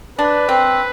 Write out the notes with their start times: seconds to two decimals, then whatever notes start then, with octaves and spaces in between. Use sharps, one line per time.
0.19 D4 B4
0.49 C4